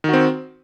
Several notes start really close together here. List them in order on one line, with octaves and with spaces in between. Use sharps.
D#3 F#4 C4